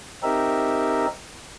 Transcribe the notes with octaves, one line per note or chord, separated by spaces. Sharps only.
C4 D#4 G4 A#4 E5